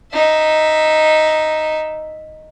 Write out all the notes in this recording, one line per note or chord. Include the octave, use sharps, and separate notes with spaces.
D#4 E5